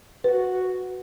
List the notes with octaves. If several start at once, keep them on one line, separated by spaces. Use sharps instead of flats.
F#4 B4